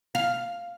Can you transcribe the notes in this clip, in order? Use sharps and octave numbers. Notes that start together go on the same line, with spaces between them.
F5